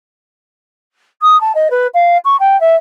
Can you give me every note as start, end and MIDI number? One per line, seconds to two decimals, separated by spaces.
1.22 1.39 87
1.41 1.52 81
1.55 1.68 75
1.70 1.87 71
1.94 2.17 77
2.24 2.36 85
2.40 2.59 79
2.60 2.76 76